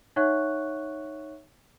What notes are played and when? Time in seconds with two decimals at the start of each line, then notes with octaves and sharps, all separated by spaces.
0.16 D#4 C#5 E5 F#5 C#6 F#6